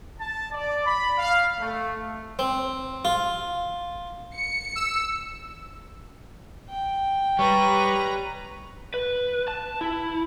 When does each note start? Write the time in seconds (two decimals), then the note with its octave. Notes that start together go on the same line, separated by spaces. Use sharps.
0.20 A5
0.53 D5
0.87 B5
1.18 F5
1.60 A3
2.39 C4
3.05 F4
4.34 C#7
4.76 E6
6.69 G5
7.39 G3 B4 C#5 A#5
8.94 B4
9.48 A5
9.81 E4